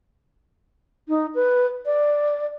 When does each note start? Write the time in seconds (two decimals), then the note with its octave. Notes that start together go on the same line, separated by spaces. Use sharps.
1.09 D#4
1.35 B4
1.86 D5